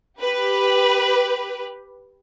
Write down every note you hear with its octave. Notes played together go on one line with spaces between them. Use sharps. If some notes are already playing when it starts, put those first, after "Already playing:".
G4 B4